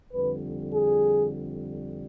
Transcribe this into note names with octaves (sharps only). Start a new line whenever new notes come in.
F2 D3 G3 B4
G#4